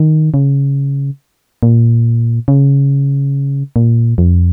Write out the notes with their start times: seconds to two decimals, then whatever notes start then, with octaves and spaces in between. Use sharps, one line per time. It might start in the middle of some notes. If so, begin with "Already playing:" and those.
Already playing: D#3
0.34 C#3
1.63 A#2
2.48 C#3
3.76 A#2
4.18 F2